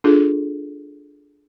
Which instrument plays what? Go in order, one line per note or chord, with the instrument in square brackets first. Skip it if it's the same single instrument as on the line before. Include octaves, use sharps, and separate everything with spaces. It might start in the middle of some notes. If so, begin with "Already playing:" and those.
[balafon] D4 F4 G#4 A4